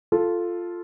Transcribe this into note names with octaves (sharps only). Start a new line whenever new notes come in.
F4 A4